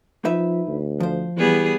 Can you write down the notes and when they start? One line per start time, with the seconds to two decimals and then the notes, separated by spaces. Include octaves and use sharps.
0.25 F3 D#4 B4 E5
0.68 D2
1.00 F3 C5
1.37 E3 G3 B3 G#4